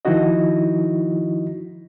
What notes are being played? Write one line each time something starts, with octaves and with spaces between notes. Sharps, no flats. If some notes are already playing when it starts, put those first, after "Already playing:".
D#3 F3 D#4 E4 F#4 D#5